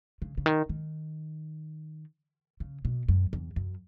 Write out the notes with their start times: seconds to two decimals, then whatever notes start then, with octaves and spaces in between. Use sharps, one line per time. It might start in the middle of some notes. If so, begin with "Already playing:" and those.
0.22 C#3
0.37 C#3
0.46 D#3
0.69 D#3
2.60 C#3
2.85 B2
3.08 F#2
3.33 E2
3.56 F#2